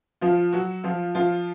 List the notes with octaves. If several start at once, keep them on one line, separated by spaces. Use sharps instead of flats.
F3 F4
F#3 F#4
F3 F4
F3 F4